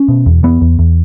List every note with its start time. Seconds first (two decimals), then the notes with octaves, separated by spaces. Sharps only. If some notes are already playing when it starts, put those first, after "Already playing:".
Already playing: C#4
0.08 B2
0.26 E2
0.43 E2 B3
0.61 E2
0.79 E2